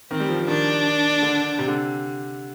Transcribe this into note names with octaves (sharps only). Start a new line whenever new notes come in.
D#3 C4
G3
F3
F3
D#3 D4
D3
C3
D3